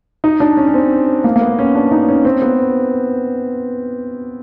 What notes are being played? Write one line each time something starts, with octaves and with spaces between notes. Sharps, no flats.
D#4
D4
C#4
C#4
C4
A#3
A#3
B3
C#4
D4
D#4
C#4
C4
B3